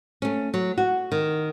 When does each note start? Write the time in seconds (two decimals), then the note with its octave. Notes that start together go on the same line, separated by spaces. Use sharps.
0.22 A3 C#4
0.54 F#3
0.78 F#4
1.12 D#3